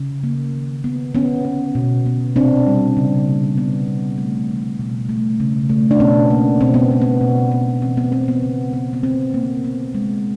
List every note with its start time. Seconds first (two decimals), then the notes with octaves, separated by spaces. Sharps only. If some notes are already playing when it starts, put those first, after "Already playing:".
Already playing: C#3
0.23 A#3
0.54 D#3
0.84 B3
1.14 D3 B3 C#4
1.45 B3
1.75 B2
2.06 B3
2.36 C3 C4 D4
2.67 G3
2.97 C#3
3.27 A#3
3.58 B3
3.88 G3
4.18 A3
4.49 E3
4.79 B2
5.09 A3
5.40 C#3
5.69 A3
5.91 D4
6.00 B2 B3 C#4
6.30 A#3
6.61 B2 C4
6.74 B3
6.91 B3
7.01 B3
7.21 B2
7.52 B3
7.82 E3 C4
7.97 B3
8.12 B3 C4
8.28 B3
8.43 C#3
8.73 B3
8.93 B3
9.03 D3 C4
9.34 A#3
9.64 B3
9.95 G#3